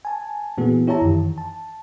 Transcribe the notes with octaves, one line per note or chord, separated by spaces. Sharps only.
G#5 A5
A#2 E3 A3 B3 F#4 G#4
E4 G4 C#5 E5 A5 A#5
F#2 D#3 E3
A5